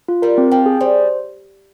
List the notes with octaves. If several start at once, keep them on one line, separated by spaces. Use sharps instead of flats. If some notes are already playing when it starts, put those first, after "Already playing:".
F4
G3 A#4
C4
F3 G5
G#4
G3 C5